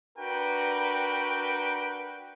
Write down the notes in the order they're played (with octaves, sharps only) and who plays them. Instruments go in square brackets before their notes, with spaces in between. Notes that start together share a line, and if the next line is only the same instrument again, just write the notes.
[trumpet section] D4 F#4 A#4 B4 G5